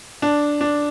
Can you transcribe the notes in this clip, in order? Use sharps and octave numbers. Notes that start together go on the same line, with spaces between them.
D4
D4